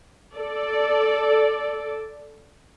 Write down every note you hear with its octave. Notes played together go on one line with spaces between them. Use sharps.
A4 D5